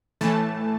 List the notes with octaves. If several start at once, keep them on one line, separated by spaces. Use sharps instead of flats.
A2 E3 A3 A5